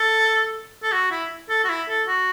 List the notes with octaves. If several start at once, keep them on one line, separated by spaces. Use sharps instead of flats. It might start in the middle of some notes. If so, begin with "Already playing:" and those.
Already playing: A4
A4
F#4
E4
A4
F#4
E4
A4
F#4